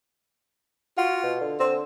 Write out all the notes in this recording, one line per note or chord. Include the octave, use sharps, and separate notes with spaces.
F4 F#4
B2
D3
D3 C4